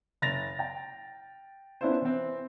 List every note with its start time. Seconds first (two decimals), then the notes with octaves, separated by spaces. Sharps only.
0.22 F#1 A6 A#6 F7
0.59 G5
1.81 B3 C#4 D4 E4 F4 C5
2.02 E3 C4